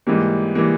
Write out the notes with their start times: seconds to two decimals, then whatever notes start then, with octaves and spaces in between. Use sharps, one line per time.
0.07 G#2 E3 G3 A#3
0.55 E3 G3 A#3